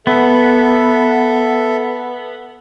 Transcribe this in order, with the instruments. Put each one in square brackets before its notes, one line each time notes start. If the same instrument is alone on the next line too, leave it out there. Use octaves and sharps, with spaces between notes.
[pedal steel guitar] B3 [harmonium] A4 E5